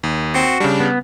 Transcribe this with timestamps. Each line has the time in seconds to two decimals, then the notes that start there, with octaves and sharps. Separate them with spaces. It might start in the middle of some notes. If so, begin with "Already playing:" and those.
0.03 D#2
0.34 C4 F#4
0.60 C#3 G3 D4
0.80 B3